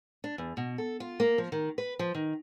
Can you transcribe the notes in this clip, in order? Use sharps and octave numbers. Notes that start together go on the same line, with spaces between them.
D4
E2
B2
A4
F4
A#3
F3
D#3
B4
F3
D#3